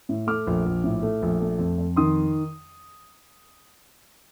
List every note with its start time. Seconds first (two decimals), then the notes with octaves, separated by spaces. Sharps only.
0.09 A2
0.27 A3 D6 F6
0.47 A#1
0.66 A#1
0.84 A2
1.02 A3
1.22 A#1
1.41 A3
1.59 F2
1.78 F2
1.96 D#3 C6 D#6